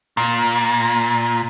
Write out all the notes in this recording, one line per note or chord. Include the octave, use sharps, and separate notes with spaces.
A#2